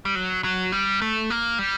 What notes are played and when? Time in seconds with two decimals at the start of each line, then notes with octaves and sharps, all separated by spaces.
0.05 G3
0.15 F#3
0.44 F#3
0.72 G3
1.02 A3
1.30 A#3
1.59 G3